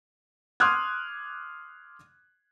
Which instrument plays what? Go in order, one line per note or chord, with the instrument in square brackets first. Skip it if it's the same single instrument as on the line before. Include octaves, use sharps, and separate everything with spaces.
[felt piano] C6 D6 D#6 F6 F#6 G#6